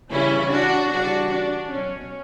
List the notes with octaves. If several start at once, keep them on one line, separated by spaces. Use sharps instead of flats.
C#3 E3 G3 C#4 E4
D4 F#4
C#3 E3 G3 D4 F#4
D4
B2 F#3 C#4